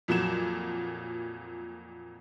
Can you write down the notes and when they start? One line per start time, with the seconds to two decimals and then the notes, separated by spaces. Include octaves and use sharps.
0.08 F2 A#2 F#3 E7